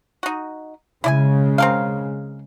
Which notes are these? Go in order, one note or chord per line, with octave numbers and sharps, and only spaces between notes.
D#4 F#4
C#3 G#3 E4 D5 G#5
C4 A#4 F5